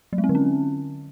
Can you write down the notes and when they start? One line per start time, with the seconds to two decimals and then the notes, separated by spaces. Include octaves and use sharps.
0.13 F#3
0.18 G#3
0.24 C4
0.29 D3
0.35 C#4